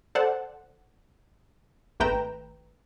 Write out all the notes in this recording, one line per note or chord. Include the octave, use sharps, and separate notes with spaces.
A4 C5 D5 F#5 A5
G#1 A3 B4 G5 A#5 E7